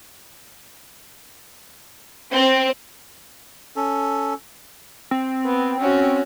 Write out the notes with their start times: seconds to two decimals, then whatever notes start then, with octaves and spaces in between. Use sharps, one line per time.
2.32 C4
3.76 C#4 A4
5.11 C4
5.45 B3
5.80 C#4 F#4